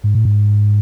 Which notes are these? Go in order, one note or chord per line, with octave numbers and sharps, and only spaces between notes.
G#2
A2
G#2